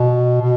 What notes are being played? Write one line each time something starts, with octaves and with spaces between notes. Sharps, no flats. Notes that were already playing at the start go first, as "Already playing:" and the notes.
Already playing: B2
B2